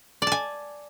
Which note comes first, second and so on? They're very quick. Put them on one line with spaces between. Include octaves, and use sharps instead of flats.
D5 A5 G#5